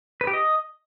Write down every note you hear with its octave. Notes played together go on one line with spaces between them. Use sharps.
B4
G4
D#5